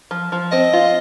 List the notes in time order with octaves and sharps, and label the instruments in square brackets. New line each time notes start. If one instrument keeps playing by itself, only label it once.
[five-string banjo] F3
F3
[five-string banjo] C4 [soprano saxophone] D#5
[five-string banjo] F4